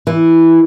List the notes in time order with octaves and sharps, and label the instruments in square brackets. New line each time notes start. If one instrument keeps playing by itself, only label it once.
[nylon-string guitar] E3